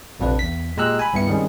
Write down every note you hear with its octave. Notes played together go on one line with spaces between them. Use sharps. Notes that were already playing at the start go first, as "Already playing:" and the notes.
A#1 F2 C3 D4 B4
E2 B6
A#2 G#3 G4 A#5 E6 F#6
G#5 B5
C#2 G2 B3 E4 C#7
D#3 G3 G#3 C4 C#4